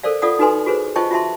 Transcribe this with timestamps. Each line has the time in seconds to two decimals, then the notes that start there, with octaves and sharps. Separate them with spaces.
0.03 A4 A#4 C5 D5 F5
0.22 F4 A4 D5 F5 F#5 D#6
0.39 D#4 F#4 A4 B4 G#5 C6
0.66 F#4 G#4 B4 C5
0.96 F4 C5 D#5 G5 A5 C#6
1.11 F4 F#4 E5 A5 C6